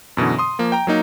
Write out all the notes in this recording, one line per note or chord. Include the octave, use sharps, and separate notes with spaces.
F#2 B2 D3 E3
C6 D#6
F3 A#3
G5 A#5
F#3 A#3 D#4